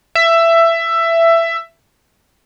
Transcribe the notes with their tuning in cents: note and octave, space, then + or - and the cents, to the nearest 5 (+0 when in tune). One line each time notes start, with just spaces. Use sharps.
E5 +15